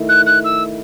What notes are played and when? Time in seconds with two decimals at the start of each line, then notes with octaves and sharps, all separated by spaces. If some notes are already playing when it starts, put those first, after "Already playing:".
Already playing: D#3 A3 E4
0.09 F#6
0.26 F#6
0.44 E6